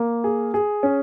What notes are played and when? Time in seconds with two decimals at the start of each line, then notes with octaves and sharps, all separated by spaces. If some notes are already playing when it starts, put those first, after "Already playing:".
Already playing: A#3
0.24 G#4
0.54 G#4
0.83 C#4